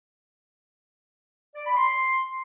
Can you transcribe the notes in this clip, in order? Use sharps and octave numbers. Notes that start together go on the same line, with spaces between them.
D5
B5
C6